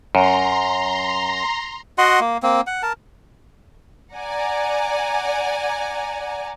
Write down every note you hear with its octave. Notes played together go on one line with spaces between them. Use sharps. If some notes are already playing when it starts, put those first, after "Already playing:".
F#2 A#5 C6
F#4 D#5 F#5 C6
A#3
A#3 C4
F#5
A#4 A5
D5 F#5 G#5 A#5